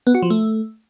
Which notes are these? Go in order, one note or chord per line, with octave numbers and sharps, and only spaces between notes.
B3
F#4
F3
A3